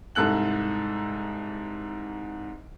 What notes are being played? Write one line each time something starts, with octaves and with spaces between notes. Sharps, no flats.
C2 G#2 A4 F#6 F#7